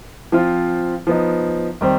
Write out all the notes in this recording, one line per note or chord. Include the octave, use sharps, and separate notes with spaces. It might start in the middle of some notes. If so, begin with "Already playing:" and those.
F3 C4 F4
F3 B3 D#4
D#3 G3 C4